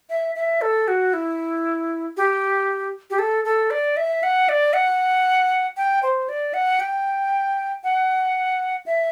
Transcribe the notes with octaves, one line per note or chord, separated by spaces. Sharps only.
E5
E5
A4
F#4
E4
G4
G4
A4
A4
D5
E5
F#5
D5
F#5
G5
C5
D5
F#5
G5
F#5
E5